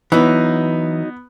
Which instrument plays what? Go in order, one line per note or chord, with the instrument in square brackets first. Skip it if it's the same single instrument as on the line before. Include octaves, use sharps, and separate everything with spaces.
[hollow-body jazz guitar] E3 [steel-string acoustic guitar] F#3 D#4 [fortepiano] B3